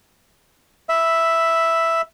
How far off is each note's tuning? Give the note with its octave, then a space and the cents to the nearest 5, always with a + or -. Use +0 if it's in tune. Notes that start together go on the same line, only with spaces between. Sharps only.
E5 +0 B5 +5